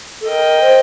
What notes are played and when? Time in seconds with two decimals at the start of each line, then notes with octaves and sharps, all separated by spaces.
0.21 A4
0.28 A#4 D#5 G5
0.60 C5